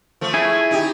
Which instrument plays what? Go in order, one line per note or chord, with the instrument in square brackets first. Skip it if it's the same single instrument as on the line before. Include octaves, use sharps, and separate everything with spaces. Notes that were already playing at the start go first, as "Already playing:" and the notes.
[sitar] F3 A3
[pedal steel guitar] E4 G#4
[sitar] D#4 G4